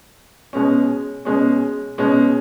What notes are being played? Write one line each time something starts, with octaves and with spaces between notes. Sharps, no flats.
B2 G#3 C#4
B2 G#3 C#4
B2 G#3 C#4